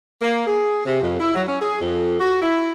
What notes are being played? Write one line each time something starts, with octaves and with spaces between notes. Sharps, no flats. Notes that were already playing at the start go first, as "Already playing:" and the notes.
A#3
G#4
C3
F2
E4
F#3
C#4
G#4
F2
F#4
E4